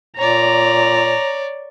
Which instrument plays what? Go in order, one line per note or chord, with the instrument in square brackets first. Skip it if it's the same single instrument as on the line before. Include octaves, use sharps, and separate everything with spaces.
[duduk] A#2 [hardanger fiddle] C#5 D5 [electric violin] A#5